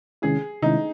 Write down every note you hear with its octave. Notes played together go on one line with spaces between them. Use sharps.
C3 D#3 G#3 C#4 E4 G#4
C3 D#3 G#3 C#4 D#4 E4